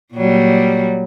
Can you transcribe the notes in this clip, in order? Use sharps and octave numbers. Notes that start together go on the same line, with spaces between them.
A#2 F#3 G3